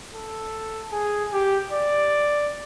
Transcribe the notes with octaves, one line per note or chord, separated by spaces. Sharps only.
A4
G#4
G4
D5